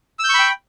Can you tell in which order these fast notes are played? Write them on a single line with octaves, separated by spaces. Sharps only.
E6 G6 C#6 B5 G5